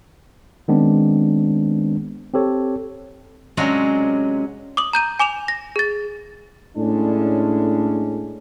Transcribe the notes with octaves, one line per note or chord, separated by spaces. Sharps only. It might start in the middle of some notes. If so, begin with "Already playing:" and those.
D#3 G#3 B3 C4 D4
C4 G4 A4 C#5
C3 F#3 G#3 C#4 D4 F4
D6 D#6 F#7
A#5 G6 D#7
G#5 D6 E7 F7
A#6
G#4 A6
A2 G#3 C#4 D4